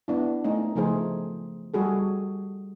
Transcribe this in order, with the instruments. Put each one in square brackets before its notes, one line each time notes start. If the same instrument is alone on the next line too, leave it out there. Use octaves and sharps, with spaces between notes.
[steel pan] B3 D4 E4
A3 C#4 D#4
C#3 F3 A3 D#4 G#4 C5
G3 F#4 G#4 A4